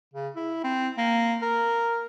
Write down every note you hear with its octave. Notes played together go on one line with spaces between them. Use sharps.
C#3
E4
C4
A#3
A#4